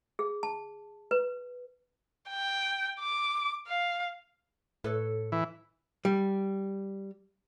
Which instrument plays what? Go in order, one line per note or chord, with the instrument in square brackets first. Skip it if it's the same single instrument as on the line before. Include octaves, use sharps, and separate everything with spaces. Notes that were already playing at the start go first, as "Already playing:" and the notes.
[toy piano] G#4
A5
B4
[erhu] G5
D6
F5
[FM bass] A2 [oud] A4 B4 C#5
[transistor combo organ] E3
[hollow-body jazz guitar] G3